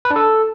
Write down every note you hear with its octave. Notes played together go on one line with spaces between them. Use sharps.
B4
D4
A4